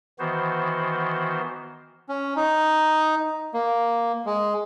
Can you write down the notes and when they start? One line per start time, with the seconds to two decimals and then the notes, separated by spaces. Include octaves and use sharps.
0.19 D#3 E3 B3 F#4 C5
2.09 C#4
2.36 D#4
3.54 A#3
4.26 G#3